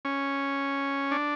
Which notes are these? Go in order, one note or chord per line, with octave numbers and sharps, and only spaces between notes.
C#4
D4